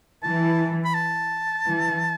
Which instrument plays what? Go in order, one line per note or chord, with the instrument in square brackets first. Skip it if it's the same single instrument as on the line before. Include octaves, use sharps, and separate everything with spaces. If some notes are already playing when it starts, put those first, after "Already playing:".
[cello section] E3 [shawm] A5
[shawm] B5
A5
[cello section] E3